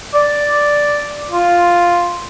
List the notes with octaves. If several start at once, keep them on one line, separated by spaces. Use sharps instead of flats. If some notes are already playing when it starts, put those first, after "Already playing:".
D5
F4